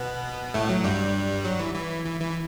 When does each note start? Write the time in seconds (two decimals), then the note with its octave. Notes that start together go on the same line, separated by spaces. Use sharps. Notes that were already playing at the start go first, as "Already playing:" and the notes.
Already playing: B2 B3
0.54 A2 A3
0.69 F#3
0.84 G2 G3
1.44 F#3
1.59 E3
1.74 E3
2.05 E3
2.20 E3